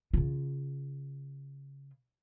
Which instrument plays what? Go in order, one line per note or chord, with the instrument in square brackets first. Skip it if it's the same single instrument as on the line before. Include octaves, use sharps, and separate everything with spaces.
[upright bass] C#3 F4